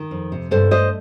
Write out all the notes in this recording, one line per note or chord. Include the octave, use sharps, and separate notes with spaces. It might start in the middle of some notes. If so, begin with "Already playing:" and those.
Already playing: D#3
F2
C3
G2 A4 C5
A3 C5 D#5